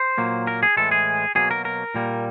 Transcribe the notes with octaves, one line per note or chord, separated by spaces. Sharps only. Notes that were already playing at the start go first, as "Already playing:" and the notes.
Already playing: C5
A#2 F#3 A#3
A#4
G#4
A2 E3 G#3 A4
G#4
B2 F#3 A#3 G#4
A#4
A#4
A#2 G3 A#3